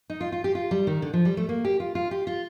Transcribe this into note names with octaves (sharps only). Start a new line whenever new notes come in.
D#4
F4
F4
G4
F4
G3
D#3
D3
F3
G3
A3
A#3
G4
F4
F4
G4
F4